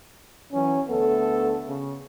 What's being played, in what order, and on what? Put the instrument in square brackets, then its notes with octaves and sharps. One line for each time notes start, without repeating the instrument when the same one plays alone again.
[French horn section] E3 F#3 [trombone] C#4
[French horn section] D2 A3 A4 [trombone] B3
[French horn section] C#3